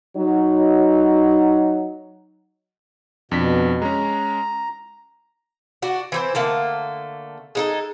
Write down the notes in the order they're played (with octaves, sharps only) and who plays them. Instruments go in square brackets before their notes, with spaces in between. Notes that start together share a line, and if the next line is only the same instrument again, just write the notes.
[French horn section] F#3 D#4
[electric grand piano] F2 D4 B6 [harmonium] B2
[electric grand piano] G#3 C#4 [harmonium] A#5
[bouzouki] D4 F#4
E3 C4 C5
D3 A3 A#3
G#3 D#4 A4